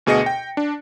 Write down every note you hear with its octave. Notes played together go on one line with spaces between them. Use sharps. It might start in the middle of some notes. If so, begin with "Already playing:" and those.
D2 B2 G#4 D#5 A#6 C#7
G5
D4